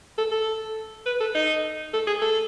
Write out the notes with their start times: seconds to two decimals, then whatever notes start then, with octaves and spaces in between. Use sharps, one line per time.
0.18 A4
0.31 A4
1.06 B4
1.20 A4
1.35 D#4
1.94 A4
2.07 G#4
2.22 A4